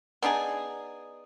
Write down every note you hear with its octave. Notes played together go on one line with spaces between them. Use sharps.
B3 D4 D#4 G#4